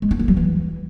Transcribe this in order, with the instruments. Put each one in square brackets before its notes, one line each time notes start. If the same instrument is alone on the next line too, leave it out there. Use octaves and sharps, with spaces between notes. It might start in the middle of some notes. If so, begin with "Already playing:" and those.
[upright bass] G#3
D4
A#3
F#3
E3